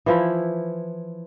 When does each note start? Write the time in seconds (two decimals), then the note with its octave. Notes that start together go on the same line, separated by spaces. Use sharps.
0.06 E3 F3 E4